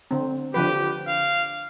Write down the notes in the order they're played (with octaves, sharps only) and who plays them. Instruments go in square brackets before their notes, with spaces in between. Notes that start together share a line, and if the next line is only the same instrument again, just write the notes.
[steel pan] D3 C4
[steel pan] D3 F3 B4 [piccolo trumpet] G4
[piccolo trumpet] F5